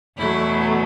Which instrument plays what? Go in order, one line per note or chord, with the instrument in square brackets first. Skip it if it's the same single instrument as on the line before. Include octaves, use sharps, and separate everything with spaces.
[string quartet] E2 B2 F#3 A3 E4